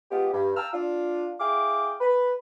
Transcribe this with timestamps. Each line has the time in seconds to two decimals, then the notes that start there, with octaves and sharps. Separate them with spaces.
0.11 G#3 B3 F4 G4
0.33 G2
0.56 F5 G5 A5 A#5 E6 F6
0.73 D4 F4
1.40 E4 G#4 F5 G5 D6
2.00 B4